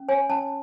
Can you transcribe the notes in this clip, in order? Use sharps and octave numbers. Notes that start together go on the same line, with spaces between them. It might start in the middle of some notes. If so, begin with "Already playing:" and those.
Already playing: C#4
C#5 G#5
C#4 A5